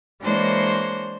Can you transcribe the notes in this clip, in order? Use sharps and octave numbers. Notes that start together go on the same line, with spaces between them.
E3 G#3 A#3 D4 C5 C#5